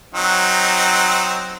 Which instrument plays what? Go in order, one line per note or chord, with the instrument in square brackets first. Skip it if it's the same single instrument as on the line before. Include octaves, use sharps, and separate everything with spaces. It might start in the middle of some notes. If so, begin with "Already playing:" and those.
[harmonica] F#3 C4 D#4